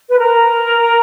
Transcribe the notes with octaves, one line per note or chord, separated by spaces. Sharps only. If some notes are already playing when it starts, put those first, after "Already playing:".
B4
A#4